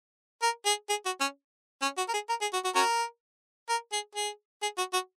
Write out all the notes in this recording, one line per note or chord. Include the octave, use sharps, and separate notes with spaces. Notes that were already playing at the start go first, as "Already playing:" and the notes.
A#4
G#4
G#4
F#4
C#4
C#4
F#4
A#4
G#4
A#4
G#4
F#4
F#4
C#4 F#4 A#4
A#4
G#4
G#4
G#4
F#4
F#4